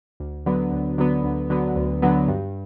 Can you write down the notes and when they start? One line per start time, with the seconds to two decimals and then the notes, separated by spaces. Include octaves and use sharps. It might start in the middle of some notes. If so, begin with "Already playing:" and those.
0.20 D2
0.46 D3 F#3 B3
0.72 D2
0.98 D3 F#3 B3
1.24 D2
1.50 D3 F#3 B3
1.76 D2
2.02 D3 F#3 B3
2.28 G2